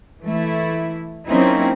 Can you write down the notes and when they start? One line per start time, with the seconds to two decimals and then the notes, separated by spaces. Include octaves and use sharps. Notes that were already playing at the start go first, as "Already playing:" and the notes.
0.22 E3 A3 E4
1.27 F#3 A#3 C4 C#4 D#4 E4